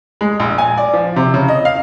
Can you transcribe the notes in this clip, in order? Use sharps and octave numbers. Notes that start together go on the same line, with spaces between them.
G#3
A#1
G#5
D5
F3
C3
C#3
D#5
F5